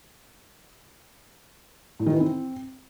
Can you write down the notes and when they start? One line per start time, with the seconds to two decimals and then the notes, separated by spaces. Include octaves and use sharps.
2.00 A2
2.06 D#3
2.13 E3
2.20 C4